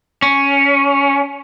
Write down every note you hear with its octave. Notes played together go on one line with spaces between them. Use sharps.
C#4